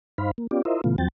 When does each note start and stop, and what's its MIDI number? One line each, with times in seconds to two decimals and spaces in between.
0.18 0.31 43
0.18 0.31 63
0.18 0.31 72
0.18 0.31 77
0.18 0.31 83
0.38 0.47 58
0.51 0.62 59
0.51 0.62 61
0.51 0.62 65
0.51 0.62 67
0.51 0.62 74
0.65 0.81 64
0.65 0.81 65
0.65 0.81 70
0.65 0.81 72
0.65 0.81 75
0.65 0.81 76
0.84 0.96 46
0.84 0.96 49
0.84 0.96 52
0.84 0.96 57
0.84 0.96 59
0.84 0.96 65
0.98 1.08 40
0.98 1.08 53
0.98 1.08 54
0.98 1.08 60
0.98 1.08 79
0.98 1.08 93